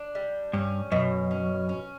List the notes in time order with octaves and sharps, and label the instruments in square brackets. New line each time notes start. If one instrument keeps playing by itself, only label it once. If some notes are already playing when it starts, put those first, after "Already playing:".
Already playing: [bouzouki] D4
G3
[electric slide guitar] G2 [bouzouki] C#4
[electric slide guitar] F#2 [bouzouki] B2
[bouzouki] C#4
C#4